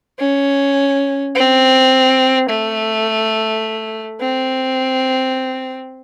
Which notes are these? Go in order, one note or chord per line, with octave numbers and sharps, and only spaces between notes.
C#4
C4
A3
C4